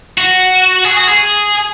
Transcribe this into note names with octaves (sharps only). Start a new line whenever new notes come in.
F#4
G#4
F#4
G#4